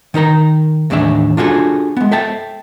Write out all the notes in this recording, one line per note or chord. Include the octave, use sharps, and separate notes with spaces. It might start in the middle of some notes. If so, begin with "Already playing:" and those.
D#3 D#4 A#4 A#5
D#2 A2 E3 D4 E5
D4 F4 F#4 G#4 A4
G#3 B3
A4 E5 G5 A5